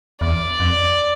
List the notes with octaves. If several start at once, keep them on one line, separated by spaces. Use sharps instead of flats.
E2 D5
F2